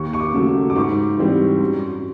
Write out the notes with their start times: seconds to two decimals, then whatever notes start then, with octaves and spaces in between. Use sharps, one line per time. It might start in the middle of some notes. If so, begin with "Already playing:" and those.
Already playing: D#2 C#6
0.13 C#6
0.20 D6
0.33 C#3 F#3 A3
0.70 D6
0.76 G#2 C#6
1.18 E3 G3 C4
1.61 F#2